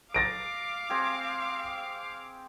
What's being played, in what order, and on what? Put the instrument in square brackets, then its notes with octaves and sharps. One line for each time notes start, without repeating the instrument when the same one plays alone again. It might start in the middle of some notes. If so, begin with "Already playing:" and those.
[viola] F5 D6 [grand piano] A6 A#6 D7
[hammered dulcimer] C4 G4 G#4